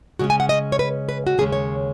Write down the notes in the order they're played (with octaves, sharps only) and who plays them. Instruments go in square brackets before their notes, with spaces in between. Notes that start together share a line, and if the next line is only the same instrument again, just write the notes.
[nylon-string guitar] C#3 G#3 C#4 F#4
G#5
F#5
D#5
C#5
B4
B4
F#4
D#2 C#3 G#3 C#4 G#4
C#5